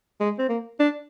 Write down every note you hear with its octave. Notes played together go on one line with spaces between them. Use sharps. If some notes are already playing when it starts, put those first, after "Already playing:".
G#3
C4
A#3
D4